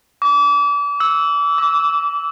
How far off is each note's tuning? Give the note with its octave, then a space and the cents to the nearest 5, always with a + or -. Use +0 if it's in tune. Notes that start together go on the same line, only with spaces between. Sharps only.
D6 -35
E6 -10
D6 -20